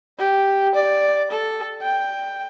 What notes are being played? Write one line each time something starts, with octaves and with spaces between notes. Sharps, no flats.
G4
D5
A4
G5